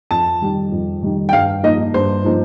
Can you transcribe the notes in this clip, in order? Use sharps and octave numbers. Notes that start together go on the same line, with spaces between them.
F2 A5
D#3 G3
F2
D#3 G3
G5
G2 F5
F3 A#3 D#4 D#5
G2 C5
F3 A#3 D#4